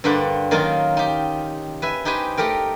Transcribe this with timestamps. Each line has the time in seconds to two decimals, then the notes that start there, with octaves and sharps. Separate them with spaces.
0.04 G2 D3 A#3 G4 C5 F#5
0.51 D#3 F#3 A#3 C#4 D#4 F4
0.97 D#4 G4
1.82 B4 E5 G#5
2.05 D#4 G4 B4 C5 G#5
2.37 A3 G4 A#4 G5